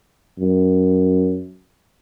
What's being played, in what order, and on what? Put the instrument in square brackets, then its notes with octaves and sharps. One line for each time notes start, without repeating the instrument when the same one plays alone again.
[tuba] F#2